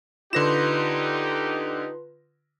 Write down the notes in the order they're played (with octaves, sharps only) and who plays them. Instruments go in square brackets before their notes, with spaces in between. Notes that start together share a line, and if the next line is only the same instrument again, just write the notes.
[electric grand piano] D3 A#6 E7 [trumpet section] D#4 G4 [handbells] F4 B4 C6